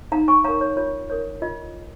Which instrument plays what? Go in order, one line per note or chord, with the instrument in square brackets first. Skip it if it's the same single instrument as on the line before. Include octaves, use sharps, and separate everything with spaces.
[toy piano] D#4 F5 A#5
G#5 C#6
A#4 C#5 F5 A#5
C#5
F4 C#5
A#4 C#5
F4 D#5